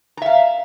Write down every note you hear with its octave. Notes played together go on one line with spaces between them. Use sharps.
E5 F5 A#5